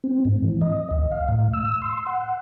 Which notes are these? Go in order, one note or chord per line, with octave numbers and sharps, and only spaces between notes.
C4
G#2
E3
D#5
D2
F5
A2
E6
C6
F#5